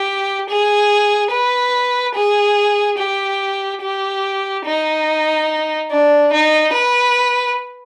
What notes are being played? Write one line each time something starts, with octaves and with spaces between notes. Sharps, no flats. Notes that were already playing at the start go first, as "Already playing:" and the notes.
Already playing: G4
G#4
B4
G#4
G4
G4
D#4
D4
D#4
B4